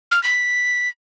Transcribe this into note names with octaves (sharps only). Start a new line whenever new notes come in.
F6
B6